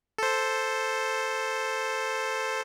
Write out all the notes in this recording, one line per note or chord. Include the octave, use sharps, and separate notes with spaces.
A4 C5